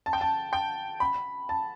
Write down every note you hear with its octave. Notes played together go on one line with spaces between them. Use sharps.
A5
G5
A5
G5
B5
A5